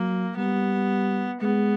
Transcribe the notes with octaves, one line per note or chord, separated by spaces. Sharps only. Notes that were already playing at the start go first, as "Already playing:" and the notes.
Already playing: F#3 A#3
G3 B3
G#3 B3